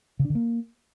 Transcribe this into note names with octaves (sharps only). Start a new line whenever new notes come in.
C#3
D4
D3
A#3